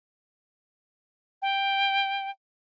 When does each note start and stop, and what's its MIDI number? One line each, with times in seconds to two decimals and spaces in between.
1.42 2.30 79